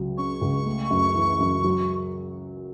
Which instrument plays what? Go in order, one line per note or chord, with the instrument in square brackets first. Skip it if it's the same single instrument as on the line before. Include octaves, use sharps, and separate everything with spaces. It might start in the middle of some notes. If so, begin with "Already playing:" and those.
Already playing: [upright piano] C#2 F#3
[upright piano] C#4 [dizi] C#6
[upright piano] C#2
A3
F#2
E3
F#2
F#3